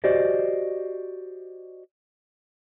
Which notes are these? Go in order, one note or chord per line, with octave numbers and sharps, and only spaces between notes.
F#4 G4 C5 D5 D#5